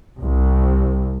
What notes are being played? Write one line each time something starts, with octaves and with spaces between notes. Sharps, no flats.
C2